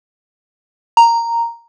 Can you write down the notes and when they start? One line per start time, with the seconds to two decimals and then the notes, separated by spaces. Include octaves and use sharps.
0.97 A#5